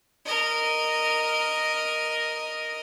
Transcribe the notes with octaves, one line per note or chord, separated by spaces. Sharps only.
A#4 D#5